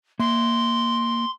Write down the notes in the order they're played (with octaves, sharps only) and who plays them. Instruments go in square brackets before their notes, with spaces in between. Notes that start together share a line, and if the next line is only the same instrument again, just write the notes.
[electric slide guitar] A#3 E5 [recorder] C6